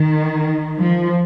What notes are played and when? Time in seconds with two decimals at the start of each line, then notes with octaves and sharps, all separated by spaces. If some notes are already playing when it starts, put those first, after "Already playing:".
Already playing: D#3
0.78 F3